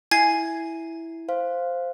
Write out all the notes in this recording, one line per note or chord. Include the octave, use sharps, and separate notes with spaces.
E4 G#5 G#6 C7
C5 F5